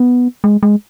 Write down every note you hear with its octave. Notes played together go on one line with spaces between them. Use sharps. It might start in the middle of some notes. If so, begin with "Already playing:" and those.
Already playing: B3
G#3
G#3